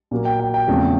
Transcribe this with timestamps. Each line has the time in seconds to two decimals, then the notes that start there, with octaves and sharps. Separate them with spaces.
0.11 A#2 F#3 A#3
0.25 G5
0.40 G5
0.54 G5
0.68 E2 C#3 F3 A3 C4